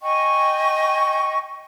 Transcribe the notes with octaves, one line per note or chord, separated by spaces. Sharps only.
D#5 G5 G#5 C#6